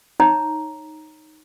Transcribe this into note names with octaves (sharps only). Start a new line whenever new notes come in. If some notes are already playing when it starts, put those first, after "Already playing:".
D#4 C#5 A#5